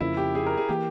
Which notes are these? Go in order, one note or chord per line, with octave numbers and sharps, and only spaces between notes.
F2 C#3 F3 A#3 E4
G4
G#4
A#4
G#4
E3 A#3 G4